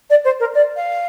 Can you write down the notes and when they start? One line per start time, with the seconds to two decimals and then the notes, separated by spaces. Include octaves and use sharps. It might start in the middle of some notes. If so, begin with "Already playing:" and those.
0.10 D5
0.24 C5
0.40 A#4
0.54 D5
0.76 F5